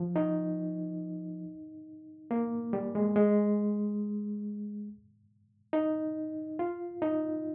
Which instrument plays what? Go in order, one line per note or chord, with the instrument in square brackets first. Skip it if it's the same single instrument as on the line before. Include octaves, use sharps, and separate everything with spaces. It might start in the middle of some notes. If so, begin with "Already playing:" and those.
Already playing: [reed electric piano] F3
D#4
A#3
G3
G#3
G#3
D#4
F4
D#4